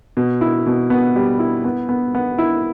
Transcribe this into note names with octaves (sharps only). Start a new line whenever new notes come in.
B2
E4
B2
B3
G3
E4
B3
B3
B3
E4